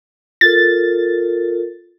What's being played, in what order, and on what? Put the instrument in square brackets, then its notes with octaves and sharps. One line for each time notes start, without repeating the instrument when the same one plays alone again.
[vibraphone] F4 A4 A#4 [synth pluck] A6